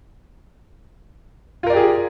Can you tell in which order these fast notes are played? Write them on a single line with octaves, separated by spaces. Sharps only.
F4 A#4 D5 G4 G#4